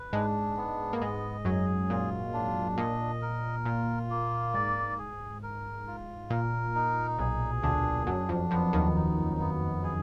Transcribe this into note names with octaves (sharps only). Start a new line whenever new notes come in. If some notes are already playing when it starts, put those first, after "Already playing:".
Already playing: B4
G#2 G#3 D4
B3
A#3
G#2 G#3 D#5
F#2 F#3 G#4
A#2 F4
D4
A#2 D#5
A#4
A#2 F4
A#3
G#2 D5
G#4
A#4
F4
A#2 A#4
D#4
B1 B2 G#4
D2 D3 D4
F#2 F#3 D4
F2 F3
F2 F3 B3
D#2 D#3
D#4
B3
G#4